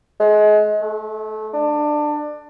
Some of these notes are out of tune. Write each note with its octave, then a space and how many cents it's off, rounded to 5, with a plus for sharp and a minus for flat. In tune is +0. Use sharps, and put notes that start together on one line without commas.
G#3 +30
A3 -25
D4 +20